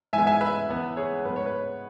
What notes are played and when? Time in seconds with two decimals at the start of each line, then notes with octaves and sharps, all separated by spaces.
0.13 G#2 E3 G#3 B3 E5 G#5
0.27 E5 G#5
0.41 B4 E5
0.69 E2 E3 B3
0.96 G#4 C#5
1.25 G#2 G#3 B3 B4
1.36 C#5
1.46 B4